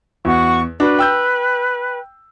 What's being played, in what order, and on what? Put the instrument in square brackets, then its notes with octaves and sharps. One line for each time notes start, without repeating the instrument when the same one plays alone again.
[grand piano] E2 [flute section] F#4 C#6
[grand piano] D4 F#4 [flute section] B4
[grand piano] G5 E6 G6